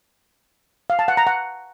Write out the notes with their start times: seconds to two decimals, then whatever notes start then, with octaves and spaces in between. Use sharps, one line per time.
0.90 F5
0.99 A5
1.08 F#5
1.17 A#5
1.27 F#5